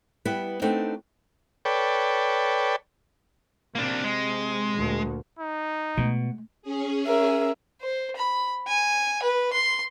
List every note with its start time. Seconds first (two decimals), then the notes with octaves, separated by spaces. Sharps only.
0.25 G3 B3 E4 B4
0.62 A3 B3 C4 D4 D#4
1.65 A4 B4 C#5 D5 G5
3.75 C3 A#3 D4
4.04 G#3
4.75 D2 A#2
5.39 D#4
5.97 B2 G#3 A3
6.62 C#4 G#4
7.07 A#4 E5
7.81 C5
8.16 B5
8.67 G#5
9.23 B4
9.53 C6